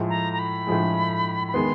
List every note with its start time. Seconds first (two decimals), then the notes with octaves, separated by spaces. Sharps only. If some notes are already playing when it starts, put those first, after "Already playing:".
Already playing: A2 F3 G#3
0.09 A#5
0.33 A#5
0.39 B5
0.67 A2 F3 G#3
1.47 B5
1.54 D#3 G#3 B3 C6